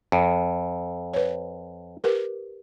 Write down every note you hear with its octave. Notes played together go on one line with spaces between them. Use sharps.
F2
B4 C#5
G4 A#4 B4